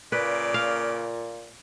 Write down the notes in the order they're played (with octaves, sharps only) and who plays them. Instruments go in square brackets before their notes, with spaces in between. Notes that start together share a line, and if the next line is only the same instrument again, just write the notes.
[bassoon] A#2 [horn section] C#3 A#3 D5 [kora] B4
[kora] F5